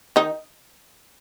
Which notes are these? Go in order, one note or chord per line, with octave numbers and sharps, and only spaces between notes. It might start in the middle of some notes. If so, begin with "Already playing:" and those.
D#3 D#4